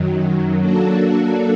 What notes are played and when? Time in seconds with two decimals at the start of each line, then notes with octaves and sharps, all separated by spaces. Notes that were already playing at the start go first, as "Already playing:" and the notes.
Already playing: F#2 D#3 F#3
0.60 F#3 A#3 D4 F#4 A4